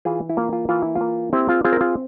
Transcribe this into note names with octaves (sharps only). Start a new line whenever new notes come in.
E3 F4 G#4
E4
A#3 F4
F4
E3 F4
E4
F4
A#3
C4 E4 G4
F4 G#4
C4 F4 G#4
A#4
F4 G#4